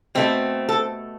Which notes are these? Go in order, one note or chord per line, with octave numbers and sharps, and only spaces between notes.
B2 A3 C4
A4